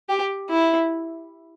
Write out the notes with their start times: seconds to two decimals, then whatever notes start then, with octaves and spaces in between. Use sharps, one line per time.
0.09 G4
0.50 E4